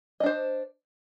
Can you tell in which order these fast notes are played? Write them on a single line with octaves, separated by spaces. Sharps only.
D#5 D4 C5